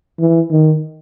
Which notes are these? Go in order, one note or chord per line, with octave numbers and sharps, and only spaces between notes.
E3
D#3